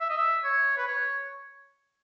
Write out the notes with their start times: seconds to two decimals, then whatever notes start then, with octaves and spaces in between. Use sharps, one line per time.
0.01 E5
0.10 D#5
0.17 E5
0.44 C#5
0.77 B4
0.87 C#5